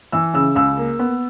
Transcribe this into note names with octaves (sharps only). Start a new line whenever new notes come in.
E3 E6
C#3 E6
C#2 E6
A#3
B3